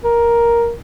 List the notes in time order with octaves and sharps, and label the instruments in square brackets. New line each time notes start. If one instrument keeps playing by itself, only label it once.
[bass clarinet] A#4